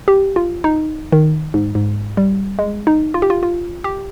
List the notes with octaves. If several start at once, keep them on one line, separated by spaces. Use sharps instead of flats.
G4
F4
D#4
D#3
G#2
G#2
G3
G#3
D#4
F4
G4
F4
F4
G4